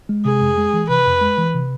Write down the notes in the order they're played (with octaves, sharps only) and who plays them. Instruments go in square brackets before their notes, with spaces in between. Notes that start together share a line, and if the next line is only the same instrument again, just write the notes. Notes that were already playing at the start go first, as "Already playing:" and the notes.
[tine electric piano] G#3
[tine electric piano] C3 [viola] G#4
[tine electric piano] F2
G#3
E3
[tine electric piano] C3 [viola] B4
[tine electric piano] F2
G#3
E3
C3